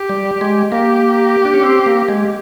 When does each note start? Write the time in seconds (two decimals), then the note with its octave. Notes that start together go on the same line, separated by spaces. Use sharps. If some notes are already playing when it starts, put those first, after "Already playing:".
Already playing: G4
0.09 G3
0.41 G#3
0.71 A#3 G4
1.45 D4
1.54 C#4
1.63 C4
1.86 A#3
2.09 G#3